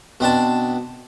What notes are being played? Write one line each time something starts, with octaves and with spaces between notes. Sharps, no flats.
B2 C4 D4 A5